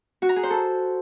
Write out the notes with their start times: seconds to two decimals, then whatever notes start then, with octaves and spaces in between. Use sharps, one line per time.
0.22 F#4
0.29 A#5
0.36 G#4
0.43 C5
0.50 A4